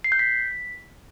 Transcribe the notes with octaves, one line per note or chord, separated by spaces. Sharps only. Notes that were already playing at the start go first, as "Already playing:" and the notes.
C7
G6
B6